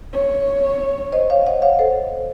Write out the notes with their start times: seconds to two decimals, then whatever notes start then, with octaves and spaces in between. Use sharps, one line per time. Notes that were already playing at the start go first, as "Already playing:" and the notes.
0.13 C#5
1.12 C5 D#5
1.30 C#5 F5
1.46 D#5 F#5
1.62 C#5 F5
1.79 A4 C5